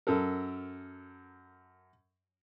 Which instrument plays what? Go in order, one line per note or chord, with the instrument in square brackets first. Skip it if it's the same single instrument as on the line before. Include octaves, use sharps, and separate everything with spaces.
[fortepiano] F#2 A4 A#4